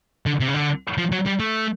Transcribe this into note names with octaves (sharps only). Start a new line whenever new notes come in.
D3
C3
C#3
D3
F3
F#3
G3
A3